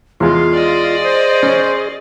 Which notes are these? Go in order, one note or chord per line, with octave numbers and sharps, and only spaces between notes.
E2 G#3 F4 G#4 C6
D5 D#5
C5
C#4